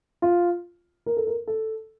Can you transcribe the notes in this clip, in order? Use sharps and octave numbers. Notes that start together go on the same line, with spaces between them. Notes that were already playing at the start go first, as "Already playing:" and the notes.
F4
A#4
A4
A#4
A4